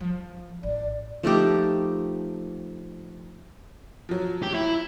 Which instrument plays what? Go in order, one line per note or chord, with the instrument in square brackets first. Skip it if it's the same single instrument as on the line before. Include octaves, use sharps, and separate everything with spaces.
[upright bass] F3
[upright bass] A1 [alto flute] D5
[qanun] F3 A3 D#4 G4
[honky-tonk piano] F3 F#3
[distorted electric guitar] G4
E4